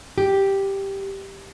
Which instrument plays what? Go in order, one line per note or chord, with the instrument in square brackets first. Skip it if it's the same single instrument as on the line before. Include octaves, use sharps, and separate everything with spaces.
[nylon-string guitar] G4